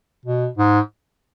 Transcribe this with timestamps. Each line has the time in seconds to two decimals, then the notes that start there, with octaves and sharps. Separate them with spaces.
0.26 B2
0.57 G#2